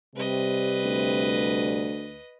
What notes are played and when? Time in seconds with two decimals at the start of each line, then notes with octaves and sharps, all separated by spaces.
0.16 C3 G3 B4 D#5
0.85 D2